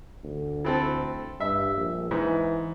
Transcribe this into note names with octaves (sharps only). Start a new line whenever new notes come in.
D2
E3 C4 A4
G2 E5
A#1
G#2 E3